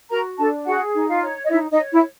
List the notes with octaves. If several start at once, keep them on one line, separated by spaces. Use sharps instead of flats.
F#4 A#4 A#5
D4 A4 A5
F#4 G#4 F#5
D#4
F4 F5
C#5
D#5
D#4 E4 E5
D#4 D#5
C#5
E4 E5